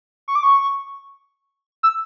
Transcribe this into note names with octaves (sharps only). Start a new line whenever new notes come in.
C#6
D6
C#6
E6